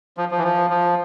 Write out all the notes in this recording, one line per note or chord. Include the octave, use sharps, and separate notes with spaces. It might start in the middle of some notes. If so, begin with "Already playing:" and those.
F3
F3
E3
F3
F3